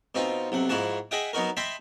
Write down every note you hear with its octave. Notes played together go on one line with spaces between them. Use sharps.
B2 C4 D#4 F4
B1 C3 F#5
G#2 F3 E4 F#4 F#5 A5
G#4 D#5 E5 F#5 G5 D#6
F#3 B3 D#4 F#4 A#4
D#5 E5 G5 A5 B5 C6